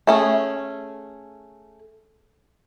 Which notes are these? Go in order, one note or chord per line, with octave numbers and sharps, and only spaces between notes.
A3 C#4 G#4